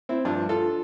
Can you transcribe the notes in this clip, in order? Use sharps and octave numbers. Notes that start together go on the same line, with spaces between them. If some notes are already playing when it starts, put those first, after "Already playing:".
C4 E4
G2 F3 D4 F4
F4 A4